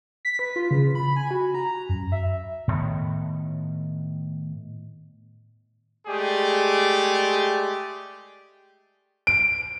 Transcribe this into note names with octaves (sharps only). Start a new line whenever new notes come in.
B6
B4
F4
C#3
B5
G#5
F#4
A#5
F#2
E5
A2 D#3 B3
G#3 A3 G4 G#4 D5
D7